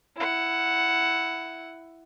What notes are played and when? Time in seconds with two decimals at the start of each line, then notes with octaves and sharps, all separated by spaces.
0.17 E4 F#5